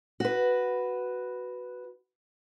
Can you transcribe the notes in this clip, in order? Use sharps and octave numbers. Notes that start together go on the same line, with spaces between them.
F#4 B4